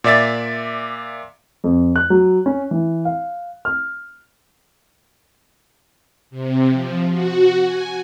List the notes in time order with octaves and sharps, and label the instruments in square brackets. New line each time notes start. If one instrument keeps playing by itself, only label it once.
[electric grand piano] A#2 D5 E5 A6
[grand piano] F2
F#6
F#3
C#4
E3
F5
F6
[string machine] C3
F3
F#4
G#5